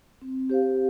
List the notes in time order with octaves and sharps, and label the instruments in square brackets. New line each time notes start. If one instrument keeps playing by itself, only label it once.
[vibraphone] C4
G4 C5 F5